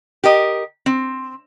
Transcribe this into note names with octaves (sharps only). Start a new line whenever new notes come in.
G4 A#4 D#5
C4